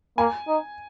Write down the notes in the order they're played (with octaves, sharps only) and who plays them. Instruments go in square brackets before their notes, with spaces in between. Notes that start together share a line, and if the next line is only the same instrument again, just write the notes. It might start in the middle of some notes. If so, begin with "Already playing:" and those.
[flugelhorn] A#3 [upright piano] G#5
[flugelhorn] D#4